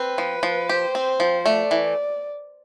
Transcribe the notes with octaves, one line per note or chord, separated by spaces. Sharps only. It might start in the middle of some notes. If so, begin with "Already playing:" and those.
Already playing: C4 B4
F3
F3
G4 C5
C4
F3
A3 D5
E3